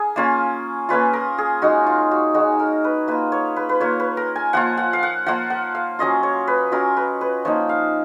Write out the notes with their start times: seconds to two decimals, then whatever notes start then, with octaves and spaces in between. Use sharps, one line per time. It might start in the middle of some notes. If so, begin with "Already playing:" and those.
Already playing: G#4 A#4
0.16 A#3 C#4 F4
0.89 A#3 C#4 F4 B4
1.13 A#4
1.38 G#4
1.62 G#3 D#4 F#4
1.87 F4
2.11 F#4
2.35 G#3 F#4
2.40 D#4
2.59 A#4
2.84 B4
3.08 A#3 F4 B4
3.32 C#5
3.56 B4
3.69 B4
3.80 A#3 F4 C#5
4.00 B4
4.17 A#4
4.36 G#5
4.53 F3 A#3 F4 F#5
4.77 F#5
4.93 F5
5.03 F#5
5.26 F3 A#3 F4 F#5
5.50 F#5
5.75 F5
5.99 F#3 C#4 F4 D#5
6.23 C#5
6.48 B4
6.72 F#3 C#4 F4 A#4
6.97 B4
7.21 B4
7.45 F3 A#3 D#4 C#5
7.69 F5